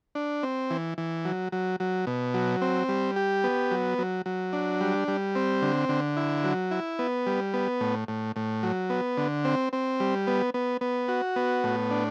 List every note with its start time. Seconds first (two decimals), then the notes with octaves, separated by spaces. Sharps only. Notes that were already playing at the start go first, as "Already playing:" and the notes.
0.15 D4
0.43 C4
0.71 E3
0.98 E3
1.25 F#3
1.52 F#3
1.80 F#3
2.07 B2
2.34 F#3
2.62 C4
2.89 G3
3.16 G4
3.44 B3
3.71 F#3
3.98 F#3
4.26 F#3
4.53 D4
4.80 G3
5.08 G3
5.35 C4
5.62 D3
5.89 D3
6.17 E4
6.44 F#3
6.71 E4
6.99 B3
7.27 G3
7.54 B3
7.80 A2
8.08 A2
8.36 A2
8.63 F#3
8.90 B3
9.17 D3
9.44 C4
9.73 C4
10.00 G3
10.27 B3
10.54 B3
10.81 B3
11.08 F#4
11.36 B3
11.64 A2
11.91 D4